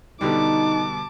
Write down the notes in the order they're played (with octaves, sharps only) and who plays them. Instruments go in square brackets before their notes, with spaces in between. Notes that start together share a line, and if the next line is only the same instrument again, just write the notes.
[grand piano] B2 D3 G3 [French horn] D#4 [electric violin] A5 D6